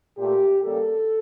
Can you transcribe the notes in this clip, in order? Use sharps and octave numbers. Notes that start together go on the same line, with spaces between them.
A#2 A3 G4
C#3 G3 A#3 A4